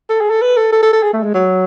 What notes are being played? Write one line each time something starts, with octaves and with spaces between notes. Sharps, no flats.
A4
G#4
A4
B4
A4
A4
A4
A4
G#4
A3
G#3
F#3